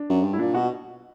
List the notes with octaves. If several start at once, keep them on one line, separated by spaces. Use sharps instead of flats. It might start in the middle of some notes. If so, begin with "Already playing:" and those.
Already playing: D4
F#2
G2
E4
A#2 D4
B2 F#4